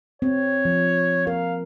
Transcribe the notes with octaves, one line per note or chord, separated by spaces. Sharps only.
C4 C#5
F3
A#4 F5